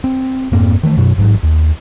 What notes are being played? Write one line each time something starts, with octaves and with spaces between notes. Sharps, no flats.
C4
F2 G#2 A#3 C4
D#3 E3 A3
F#2 B2 F#3
A1 G#2 F#3
D#2